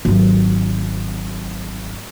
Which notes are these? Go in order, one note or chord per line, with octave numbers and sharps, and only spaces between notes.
G#1 F#3